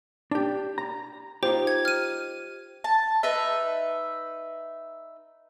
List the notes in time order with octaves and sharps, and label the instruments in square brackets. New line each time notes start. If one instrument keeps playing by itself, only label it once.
[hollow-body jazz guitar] D4 G4
A#5
[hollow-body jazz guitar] D#4 F4 G4 [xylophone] C5
[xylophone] G#6
F6 D#7
[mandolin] A5
D#4 B4 E5